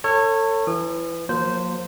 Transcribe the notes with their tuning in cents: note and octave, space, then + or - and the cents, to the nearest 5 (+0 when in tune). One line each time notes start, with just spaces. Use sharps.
A4 +35 C#5 -15
E3 +20 D#6 -40
F#3 -45 A#3 +5 C5 -10